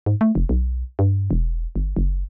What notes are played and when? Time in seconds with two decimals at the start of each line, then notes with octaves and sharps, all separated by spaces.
0.06 G#2
0.21 A3
0.35 F1
0.49 B1
0.99 G2
1.31 E1
1.76 G1
1.96 F#1